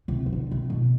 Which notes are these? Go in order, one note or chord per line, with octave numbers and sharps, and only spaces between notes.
C3
E3
D3
C3
B2